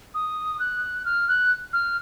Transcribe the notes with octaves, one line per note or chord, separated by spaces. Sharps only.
D#6
F#6
F6
F#6
F6